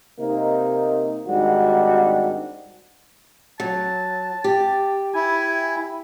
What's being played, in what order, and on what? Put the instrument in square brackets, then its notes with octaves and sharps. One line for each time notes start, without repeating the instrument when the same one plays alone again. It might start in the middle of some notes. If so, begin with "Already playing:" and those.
[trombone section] C3 A#3 D#4
G#1 G#2 G3 D4 F#4
[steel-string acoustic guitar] F#3 [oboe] A5
[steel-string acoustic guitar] G4
[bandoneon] E4 [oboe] G#5